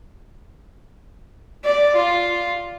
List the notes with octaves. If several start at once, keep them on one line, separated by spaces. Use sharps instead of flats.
D5
F4